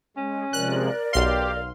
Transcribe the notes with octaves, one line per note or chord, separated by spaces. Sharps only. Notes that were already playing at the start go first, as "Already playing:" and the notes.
G#3 C#4
C3 F3 G#3 A#4 D5 F#6
B1 G4 F5 C6